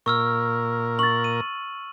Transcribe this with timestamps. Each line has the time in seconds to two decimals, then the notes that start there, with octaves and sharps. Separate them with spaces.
0.06 A#2 A#4 C#6 E6 F6
0.99 C#6 A6 F#7
1.24 D#7